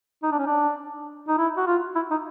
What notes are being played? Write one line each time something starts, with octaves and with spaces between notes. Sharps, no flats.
D#4
D4
C#4
D4
D#4
E4
F#4
F4
E4
D#4